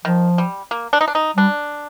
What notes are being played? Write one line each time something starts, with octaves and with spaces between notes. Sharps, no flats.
D#3 F3
G3
A#3
D4
D#4
D4
D#4
G3 D4